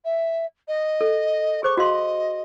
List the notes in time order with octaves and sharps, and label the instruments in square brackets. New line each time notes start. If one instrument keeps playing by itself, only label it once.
[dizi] E5
D#5
[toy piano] A4
[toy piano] G#4 C5 D6 [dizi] C#6
[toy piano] F#4 F5 C6 [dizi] D#5